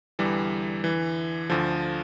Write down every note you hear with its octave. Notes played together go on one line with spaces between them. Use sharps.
E2 D3 E3 G3
E3
D2 D3 F3